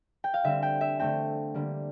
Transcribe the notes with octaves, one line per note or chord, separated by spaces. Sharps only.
G5
F5
D3 G3 C4 E5
G5
E5
D3 A3 C4 G5
D3 G3 A#3